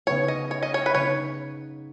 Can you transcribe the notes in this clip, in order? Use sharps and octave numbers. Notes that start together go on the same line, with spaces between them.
C#3 B3 D#4 C#5
D#5
C#5
D#5
C#5
B4
C#3 B3 D#4 C#5